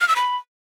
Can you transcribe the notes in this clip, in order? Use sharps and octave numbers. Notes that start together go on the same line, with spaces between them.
F6
E6
B5